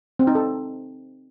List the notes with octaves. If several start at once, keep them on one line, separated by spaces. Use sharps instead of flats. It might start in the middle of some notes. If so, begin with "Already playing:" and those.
C4
D#4
A4